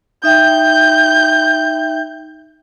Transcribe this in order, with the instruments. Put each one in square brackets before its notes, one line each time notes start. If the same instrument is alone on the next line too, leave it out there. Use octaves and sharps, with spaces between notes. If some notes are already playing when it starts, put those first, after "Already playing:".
[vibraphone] D#4 E5 G5 [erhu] G6